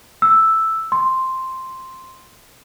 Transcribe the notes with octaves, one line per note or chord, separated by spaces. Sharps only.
E6
C6